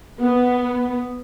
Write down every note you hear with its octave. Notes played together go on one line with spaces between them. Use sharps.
B3